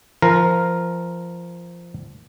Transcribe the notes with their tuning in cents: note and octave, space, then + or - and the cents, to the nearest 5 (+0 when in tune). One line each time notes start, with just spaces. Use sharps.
F3 -15 A#4 +0